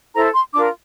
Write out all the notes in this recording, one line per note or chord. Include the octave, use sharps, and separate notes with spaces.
E4 A4 C5 A#5
C6
D4 F4 A#4 D6